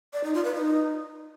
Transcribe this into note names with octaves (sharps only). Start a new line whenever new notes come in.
D5
D#4
F4
B4
D#4